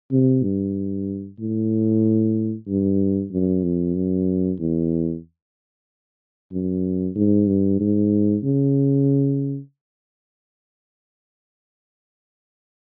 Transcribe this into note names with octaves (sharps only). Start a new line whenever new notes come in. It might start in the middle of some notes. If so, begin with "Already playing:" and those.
C3
G2
A2
G2
F#2
F2
F#2
E2
F#2
G#2
G2
G#2
C#3